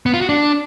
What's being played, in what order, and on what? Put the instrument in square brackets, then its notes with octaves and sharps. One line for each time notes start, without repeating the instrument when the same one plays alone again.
[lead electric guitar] B3
F4
F#4
D4